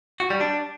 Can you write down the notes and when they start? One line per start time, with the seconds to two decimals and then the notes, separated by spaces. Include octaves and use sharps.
0.20 F#4
0.30 G3
0.41 D4